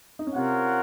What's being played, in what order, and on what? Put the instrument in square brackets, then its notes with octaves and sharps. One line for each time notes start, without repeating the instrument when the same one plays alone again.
[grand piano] D#4
C#4
[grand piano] C3 C4 [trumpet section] F4 A#4 C#5 F#5